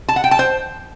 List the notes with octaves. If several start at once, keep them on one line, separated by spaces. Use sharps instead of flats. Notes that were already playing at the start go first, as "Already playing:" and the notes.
A5
F#5
G5
A5
C5